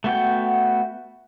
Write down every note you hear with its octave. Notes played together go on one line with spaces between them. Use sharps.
A3 B3 F#4 G5